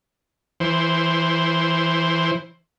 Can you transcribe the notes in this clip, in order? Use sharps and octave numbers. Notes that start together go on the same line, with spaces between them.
E3 C5